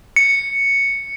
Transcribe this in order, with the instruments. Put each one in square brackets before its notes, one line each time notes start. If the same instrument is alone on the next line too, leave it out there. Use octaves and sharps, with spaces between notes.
[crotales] C#7